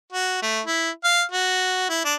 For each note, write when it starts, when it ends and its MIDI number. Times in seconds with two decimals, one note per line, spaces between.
0.12 0.37 66
0.42 0.60 57
0.66 0.90 64
1.04 1.23 77
1.32 1.88 66
1.89 2.00 64
2.04 2.15 62